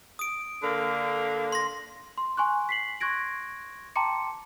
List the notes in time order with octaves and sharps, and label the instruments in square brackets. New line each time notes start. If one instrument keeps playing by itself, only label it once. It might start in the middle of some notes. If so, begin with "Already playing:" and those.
[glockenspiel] D#6 D7
[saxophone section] D3 A#3
[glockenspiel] C6 A#6
[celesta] C6
G#5 C6 C#6 F#6
B6 C7 F#7
C6 C#6 F#6 G#6 A#6 D7
G5 A5 A#5 C6 D6 C#7